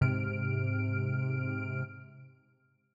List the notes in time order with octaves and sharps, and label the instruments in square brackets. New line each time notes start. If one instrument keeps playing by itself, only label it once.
[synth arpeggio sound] G#2 C3 F6 D7